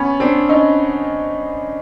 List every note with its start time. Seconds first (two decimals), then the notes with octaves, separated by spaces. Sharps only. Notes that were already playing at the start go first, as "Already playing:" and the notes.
Already playing: B3 C#4
0.20 C4 D4
0.49 C#4 D#4